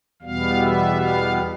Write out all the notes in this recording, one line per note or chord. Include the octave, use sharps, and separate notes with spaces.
E2 B2 G3 B3 F5
E5
F5